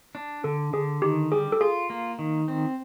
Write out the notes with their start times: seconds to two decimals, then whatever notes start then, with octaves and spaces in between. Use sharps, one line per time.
0.15 D4
0.44 D3 A4
0.73 D3 G#4
1.02 D#3 G4
1.32 G3 G#4
1.52 A4
1.61 F4 G#4
1.90 A#3
2.19 D#3
2.48 C4